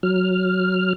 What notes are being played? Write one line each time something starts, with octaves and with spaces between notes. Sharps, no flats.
F#3 F6